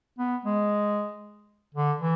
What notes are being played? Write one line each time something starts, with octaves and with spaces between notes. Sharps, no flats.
B3
G#3
D3
E3